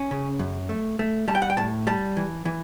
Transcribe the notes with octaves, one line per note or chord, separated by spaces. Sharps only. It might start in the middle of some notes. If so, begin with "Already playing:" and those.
Already playing: C#4
C#3
F#2
A3
A3
G3 A5
G5
F#5
G5
A2 A5
G3 A5
E3
E3